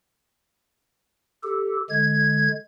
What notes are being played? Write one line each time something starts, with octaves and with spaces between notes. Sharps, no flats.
G4 A4
D3 G#3 G#6